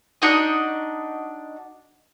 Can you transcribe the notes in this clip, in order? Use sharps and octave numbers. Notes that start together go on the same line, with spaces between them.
D4 D#4 F#4 D#5